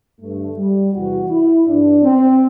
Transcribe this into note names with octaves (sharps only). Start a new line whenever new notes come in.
G2 D3 A3
G3
E2 C3 E3 F#4
E4
G2 E3 D4
C4